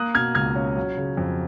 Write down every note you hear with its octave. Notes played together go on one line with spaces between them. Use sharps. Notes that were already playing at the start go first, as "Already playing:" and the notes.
Already playing: A#3 D#6 F#6
B2 F6 G#6
C#2 F6 G#6
C#4
F#3
C#3
F2